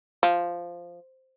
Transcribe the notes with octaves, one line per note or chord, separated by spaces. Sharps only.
F3